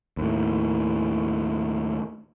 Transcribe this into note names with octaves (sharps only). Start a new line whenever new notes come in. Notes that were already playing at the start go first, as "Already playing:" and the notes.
D#2 A2